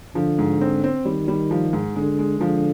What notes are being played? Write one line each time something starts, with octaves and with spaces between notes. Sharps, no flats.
D3 F3
G#2
C4
C4
D#3 G3
G3
F3
G#2
D3 G#3
G#3
D3 F3